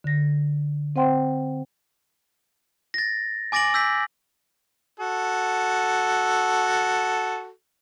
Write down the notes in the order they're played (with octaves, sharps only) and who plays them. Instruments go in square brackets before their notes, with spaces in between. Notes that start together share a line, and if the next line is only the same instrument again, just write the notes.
[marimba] D3 A#6
C4 C5 F#5 G5 C6
[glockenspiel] A6 A#6
G#5 D6 A6 A#6 D7 F#7
E6 G6 B6
[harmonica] F#4 A4